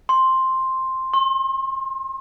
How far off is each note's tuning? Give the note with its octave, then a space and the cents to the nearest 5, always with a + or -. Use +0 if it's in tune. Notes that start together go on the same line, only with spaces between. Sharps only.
C6 +5
C6 +40